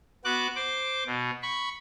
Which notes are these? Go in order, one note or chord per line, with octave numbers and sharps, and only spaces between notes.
B3 F#4 D6 F#6
C5 D6
B2
B5 C#6